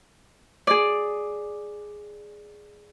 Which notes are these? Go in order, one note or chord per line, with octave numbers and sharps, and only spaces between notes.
G#4 D5